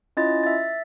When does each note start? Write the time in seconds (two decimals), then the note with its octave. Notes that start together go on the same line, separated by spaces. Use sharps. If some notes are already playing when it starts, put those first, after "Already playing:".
0.17 C#4 E4 F4 D#5 A6
0.43 E5 A6